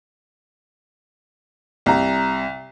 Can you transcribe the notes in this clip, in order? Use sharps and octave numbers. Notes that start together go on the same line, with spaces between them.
C2 A#5